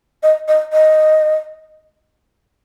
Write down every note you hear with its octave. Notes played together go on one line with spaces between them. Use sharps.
D#5
D#5
D#5